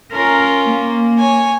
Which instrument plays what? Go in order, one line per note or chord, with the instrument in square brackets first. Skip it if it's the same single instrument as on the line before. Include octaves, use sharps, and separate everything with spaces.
[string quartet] C#4 F4 [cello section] A#4
[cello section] A#3
[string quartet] C#5 G#5